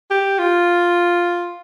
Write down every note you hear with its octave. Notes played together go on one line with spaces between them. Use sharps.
G4
F4